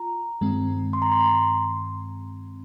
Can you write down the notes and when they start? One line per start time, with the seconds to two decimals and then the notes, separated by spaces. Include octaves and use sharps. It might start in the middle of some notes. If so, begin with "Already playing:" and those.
Already playing: F4 A#5
0.41 G2 D#3 G#3 C4
0.93 C6
1.02 A#5
1.12 C6
1.20 A#5
1.26 C6